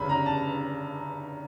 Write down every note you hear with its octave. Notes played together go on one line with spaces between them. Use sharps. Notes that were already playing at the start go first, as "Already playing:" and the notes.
Already playing: G1 F#2 C#3 B5
A#5
A5